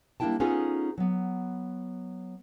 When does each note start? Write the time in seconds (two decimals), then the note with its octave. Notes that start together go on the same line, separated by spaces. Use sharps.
0.20 G3 A#3 D4 E4 G5 A5
0.40 B3 C#4 D#4 F4 G#4 A4
0.98 F#3 B3